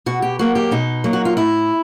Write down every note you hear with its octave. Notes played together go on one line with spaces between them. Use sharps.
B2 F#4
G4
F#3 A#3 F#4
G4
B2 D#4
F#3 A#3
F#4
F4
A2 E4